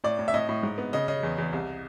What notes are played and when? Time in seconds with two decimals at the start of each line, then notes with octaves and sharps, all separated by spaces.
0.04 A2 D5
0.19 A2
0.28 E5
0.34 A2 D#5
0.49 A2
0.63 G#2
0.78 B3
0.93 C#3 D#5
1.08 C#3 D#5
1.23 E2
1.38 E2
1.53 C2